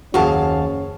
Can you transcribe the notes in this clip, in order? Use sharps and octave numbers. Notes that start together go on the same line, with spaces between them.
F#1 D#2 C#4 F#4 G#4 F5 A5 C#6